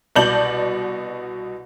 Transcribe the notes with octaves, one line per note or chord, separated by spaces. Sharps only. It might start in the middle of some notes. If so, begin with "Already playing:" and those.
C2 B2 D5 A5 G6 F#7